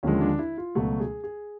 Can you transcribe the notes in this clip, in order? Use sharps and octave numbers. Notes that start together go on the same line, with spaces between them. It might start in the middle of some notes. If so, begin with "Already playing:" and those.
D#2 D3 F3 G#3 C#4
D4
E4
F4
C#2 B2 F#3 A3 F#4
G#4
G#4